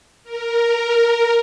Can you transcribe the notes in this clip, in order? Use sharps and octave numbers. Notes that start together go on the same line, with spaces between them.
A#4